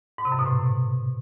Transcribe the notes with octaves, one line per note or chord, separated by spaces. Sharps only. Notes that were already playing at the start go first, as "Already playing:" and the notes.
G#2
C3
F#2
B2
A2